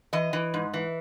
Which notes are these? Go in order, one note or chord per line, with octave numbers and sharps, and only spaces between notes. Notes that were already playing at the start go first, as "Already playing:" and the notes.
E3 D#5
E3
G#2
E3